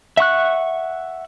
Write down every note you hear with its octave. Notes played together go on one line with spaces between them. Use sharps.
E5 F#5 C#6 F#6